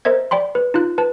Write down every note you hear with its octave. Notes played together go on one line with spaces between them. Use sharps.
A#4 C5 D#5 E5 G#6
D5 G5 B5 C6
B4
D#4 F4 F#6
B4 A5